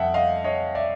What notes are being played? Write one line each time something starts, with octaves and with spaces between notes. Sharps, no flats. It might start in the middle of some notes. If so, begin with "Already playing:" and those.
Already playing: F2 E5 F#5 G5
D#5 F5
C#5 D#5
D5 E5